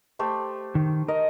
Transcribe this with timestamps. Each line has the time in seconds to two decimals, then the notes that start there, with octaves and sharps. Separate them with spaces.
0.19 A3 G4 C5
0.75 D#3
1.08 A#4 D#5